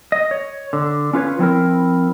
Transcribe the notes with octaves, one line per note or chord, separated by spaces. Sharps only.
D#5
C#5
D3
C#4 F4 B4 C#5
F3 C4 E4 A#4